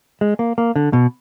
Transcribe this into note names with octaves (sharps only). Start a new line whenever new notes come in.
G#3
A#3
A#3
D3
B2